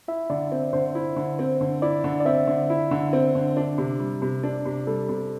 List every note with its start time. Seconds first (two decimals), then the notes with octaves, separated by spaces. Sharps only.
0.08 E4 E5
0.30 D3 D5
0.52 C4
0.73 D3 C5
0.95 E4
1.16 D3
1.39 C4
1.61 D3
1.82 E4 D5
2.04 D3
2.20 D5
2.25 C4 E5
2.47 D3
2.70 E4
2.91 D3
3.13 C4
3.35 D3
3.57 D4
3.78 C3
4.00 G3
4.22 C3
4.43 D4 D5
4.66 C3
4.87 G3 A4
5.09 C3